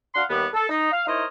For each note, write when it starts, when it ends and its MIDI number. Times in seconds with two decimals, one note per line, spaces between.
0.14 0.23 62
0.14 0.23 66
0.14 0.23 77
0.14 0.23 78
0.14 0.23 84
0.29 0.46 39
0.29 0.46 55
0.29 0.46 59
0.53 0.64 69
0.69 0.91 63
0.92 1.02 77
1.06 1.24 63
1.06 1.24 64
1.06 1.24 70
1.06 1.24 72
1.06 1.24 73
1.06 1.24 75